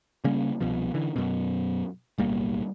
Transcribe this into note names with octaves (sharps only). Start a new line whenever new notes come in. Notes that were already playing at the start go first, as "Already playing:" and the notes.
C#3 G3 A#3 C#4
C2 B2 F3
D3 E3
F#2 B2
D1 B1 G3 A#3